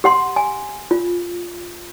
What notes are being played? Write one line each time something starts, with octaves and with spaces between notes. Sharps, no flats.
G4 F#5 C6
G#5
F4